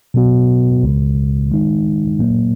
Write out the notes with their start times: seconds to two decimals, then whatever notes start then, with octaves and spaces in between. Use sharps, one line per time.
0.14 B2 F#3 B3 F#4
0.83 C#2 C#3 G#3
1.51 D#3 G#3 D#4
2.19 A#2 F#3 A#3